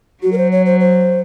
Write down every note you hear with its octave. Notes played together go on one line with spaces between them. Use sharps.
F#3 F#4
A#4
C5
C#5
C5
C5